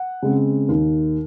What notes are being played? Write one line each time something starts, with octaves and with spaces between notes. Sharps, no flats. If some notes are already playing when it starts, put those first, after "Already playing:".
Already playing: F#5
C#3 G#3 C4
D#2